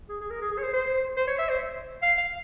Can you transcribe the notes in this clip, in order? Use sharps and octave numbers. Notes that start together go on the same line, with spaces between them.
G#4
G#4
A#4
G#4
G#4
C#5
C5
C5
C5
C#5
E5
C5
F5
F5